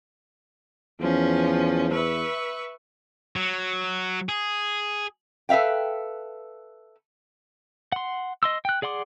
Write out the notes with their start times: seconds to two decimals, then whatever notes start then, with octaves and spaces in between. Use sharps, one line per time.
1.00 E2 F3 C#4
1.93 B4 E5 C#6
3.36 F#3
4.29 G#4
5.49 A4 B4 E5 F5 G5
7.92 F#5 C6
8.43 D#5 C6 E6
8.65 G5 F#6
8.82 G#4 D5 F#5 C6 D6